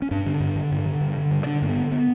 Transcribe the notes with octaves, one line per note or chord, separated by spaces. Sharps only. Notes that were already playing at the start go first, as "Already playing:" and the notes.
C#4
G2 D4
D3
G2
D3
G2
D3
G2
D3
G2
D3 D4
G2 A#3
B3
D3
B3